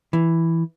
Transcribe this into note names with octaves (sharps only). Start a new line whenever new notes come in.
E3